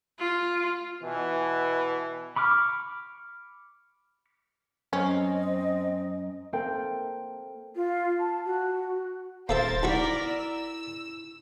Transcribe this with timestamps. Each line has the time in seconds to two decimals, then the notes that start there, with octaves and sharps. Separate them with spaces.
0.19 F4
1.02 B2 E3
2.36 B5 C#6 D6 F6
4.93 F#2 C4 C#4 D#5
6.53 A#3 C4 A4 G5
7.75 F4
8.19 A5
8.45 F#4
9.49 D#1 A#3 A4 A#4 C5 E5 A6
9.83 B1 E4 F#4 A#4 D5 C#6 B6
10.25 E6